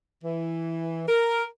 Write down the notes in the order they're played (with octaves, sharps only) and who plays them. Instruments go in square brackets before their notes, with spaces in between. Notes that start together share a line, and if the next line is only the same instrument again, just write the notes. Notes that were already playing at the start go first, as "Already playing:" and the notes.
[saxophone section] E3
A#4